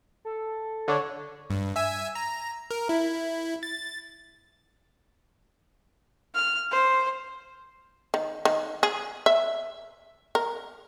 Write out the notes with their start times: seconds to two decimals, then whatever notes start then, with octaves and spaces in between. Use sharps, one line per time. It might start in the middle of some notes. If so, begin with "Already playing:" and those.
0.25 A4
0.88 D3 D4 C#5
1.50 G2
1.76 E5 G#5 E6
2.15 A#5
2.71 A#4
2.89 E4
3.63 A6
6.35 F6
6.71 C5
8.14 D#3
8.45 D#3
8.83 G#4
9.26 E5
10.35 A#4